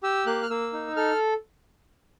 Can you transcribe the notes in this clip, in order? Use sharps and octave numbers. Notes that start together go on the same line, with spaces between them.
G4 E6
A#3 F#6
F6
A#3 E6
D#4
A4 F6